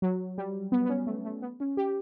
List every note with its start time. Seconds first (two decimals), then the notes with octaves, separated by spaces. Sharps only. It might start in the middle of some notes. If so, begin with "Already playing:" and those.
0.02 F#3
0.38 G3
0.72 B3
0.85 B3
0.89 C#4
1.07 A3
1.25 A3
1.42 B3
1.60 C#4
1.77 G4